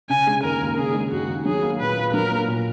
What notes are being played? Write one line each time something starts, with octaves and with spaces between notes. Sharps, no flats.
C#3 G#5
G#3
D#2 A#4
D#2
C#3 G#4
G#3
D#2 F#4
D#2
F#3 G#4
A#3
A#2 B4
F4
F#3 A#4
A#3
A#2